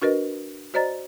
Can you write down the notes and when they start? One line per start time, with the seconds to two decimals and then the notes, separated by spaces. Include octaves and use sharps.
0.02 D4 F#4 A#4 B4 D#5
0.74 F#4 C5 D5 D#5 A#5 A6